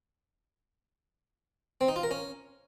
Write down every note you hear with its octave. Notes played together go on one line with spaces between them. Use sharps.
C4
D#4
F4
A#4
C#4